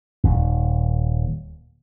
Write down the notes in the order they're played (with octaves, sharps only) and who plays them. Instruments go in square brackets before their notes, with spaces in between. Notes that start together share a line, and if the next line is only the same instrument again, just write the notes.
[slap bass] D#1 D#2